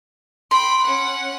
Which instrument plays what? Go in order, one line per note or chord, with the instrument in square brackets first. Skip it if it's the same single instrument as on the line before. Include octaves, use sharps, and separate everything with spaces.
[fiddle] G5 B5 [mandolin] C6
[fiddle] C#4 F#5